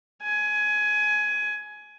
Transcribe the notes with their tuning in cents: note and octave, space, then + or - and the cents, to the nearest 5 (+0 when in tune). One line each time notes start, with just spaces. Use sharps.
G#5 +20